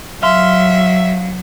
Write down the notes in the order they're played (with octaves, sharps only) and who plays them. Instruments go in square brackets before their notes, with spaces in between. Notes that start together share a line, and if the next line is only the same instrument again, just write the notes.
[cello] F#3 [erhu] E5 [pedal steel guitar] F5 C6